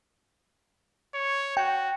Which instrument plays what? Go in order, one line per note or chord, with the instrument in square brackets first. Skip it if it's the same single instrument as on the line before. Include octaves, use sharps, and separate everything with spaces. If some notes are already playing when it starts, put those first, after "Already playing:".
[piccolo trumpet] C#5
[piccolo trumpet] F#4 [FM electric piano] G5